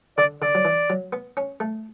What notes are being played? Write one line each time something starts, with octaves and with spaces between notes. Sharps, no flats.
D3 D5
D3 D5
F#3
E3
F#3
B3
C#4
A3